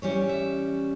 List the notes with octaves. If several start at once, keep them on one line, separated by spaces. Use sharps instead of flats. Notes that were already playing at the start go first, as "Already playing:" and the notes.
E3 G3 C#4 C#5
E5